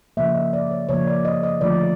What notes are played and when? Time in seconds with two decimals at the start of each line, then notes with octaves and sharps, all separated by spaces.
0.17 C#3 F3 A#3 E5
0.35 D#5
0.53 D5
0.71 C#5
0.89 C#3 F3 A#3 C#5
1.07 D5
1.25 D#5
1.43 D#5
1.61 D3 F3 A3 D5